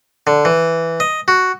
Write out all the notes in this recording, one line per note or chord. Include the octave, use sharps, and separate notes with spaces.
D3
E3
D#5
F#4